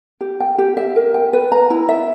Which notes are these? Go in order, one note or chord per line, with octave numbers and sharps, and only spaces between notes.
G4
G5
G4
E5
A#4
G5
B4
A#5
E4
E5